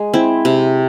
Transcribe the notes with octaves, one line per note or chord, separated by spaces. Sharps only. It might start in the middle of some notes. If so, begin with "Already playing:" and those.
Already playing: G#3
C4 E4
C3